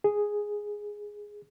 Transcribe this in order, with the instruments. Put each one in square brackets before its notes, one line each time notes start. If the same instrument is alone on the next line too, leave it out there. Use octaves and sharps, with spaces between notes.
[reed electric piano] G#4